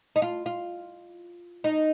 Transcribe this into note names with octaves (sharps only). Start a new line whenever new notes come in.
D#4
F4
F4
D#4